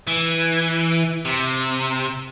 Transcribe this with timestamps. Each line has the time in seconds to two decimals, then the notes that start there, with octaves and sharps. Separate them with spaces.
0.07 E3
1.25 C3